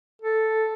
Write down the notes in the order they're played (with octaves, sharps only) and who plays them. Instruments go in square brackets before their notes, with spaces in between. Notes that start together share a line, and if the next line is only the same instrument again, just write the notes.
[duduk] A4